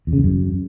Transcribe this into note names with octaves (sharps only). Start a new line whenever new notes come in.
E2
C#3
E2
F#2